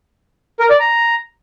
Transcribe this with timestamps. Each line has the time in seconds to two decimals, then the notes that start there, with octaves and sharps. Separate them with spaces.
0.59 A#4
0.69 D5
0.80 A#5